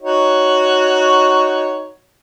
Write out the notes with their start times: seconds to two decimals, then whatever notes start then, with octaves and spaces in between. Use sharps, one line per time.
0.03 D#4 F#4 C#5